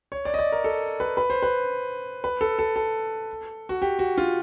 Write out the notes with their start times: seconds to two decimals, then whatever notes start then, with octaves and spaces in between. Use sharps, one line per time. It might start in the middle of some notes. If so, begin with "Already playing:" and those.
0.12 C#5
0.25 D5
0.34 D#5
0.39 D5
0.52 A#4
0.64 A4
1.00 B4
1.17 B4
1.30 C5
1.43 B4
2.24 B4
2.41 A4
2.59 A4
2.76 A4
3.69 F#4
3.82 G4
3.99 F#4
4.18 F4